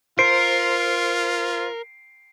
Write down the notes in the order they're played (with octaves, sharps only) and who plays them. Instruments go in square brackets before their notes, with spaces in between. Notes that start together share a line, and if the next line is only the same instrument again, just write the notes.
[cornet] F4 [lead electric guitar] A#4 [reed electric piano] C5 [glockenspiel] C7 D7